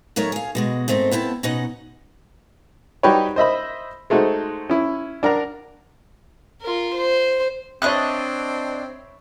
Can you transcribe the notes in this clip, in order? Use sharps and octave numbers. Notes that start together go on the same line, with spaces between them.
D#3 F#3 A3 A#4 C#5
G#4 F5
B2 G#3 F#4
G#2 A3 C4 D#4 A#4
B3 C4 E4 A5
B2 C#4 D#4 D#5 F#5
G3 D#4 F#4 G4 B4 C#5
C5 D#5 E5 B5
G#3 A3 D#4 F#4 C5
C#4 E4
D4 A#4 F#5 A#5
F4 A#4
C5
C4 D4 C#5 D#5 E5 B5 F#6